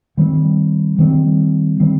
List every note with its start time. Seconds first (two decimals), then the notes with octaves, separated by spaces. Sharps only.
0.17 D#3 G3 C4
0.99 D#3 G3 C4
1.80 D#3 G3 C4